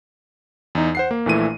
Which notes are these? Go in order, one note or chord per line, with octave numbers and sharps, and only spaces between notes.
E2 D#4
C5 F#5 C7
A#3
A#1 A#2 E3 A3 E4 D#7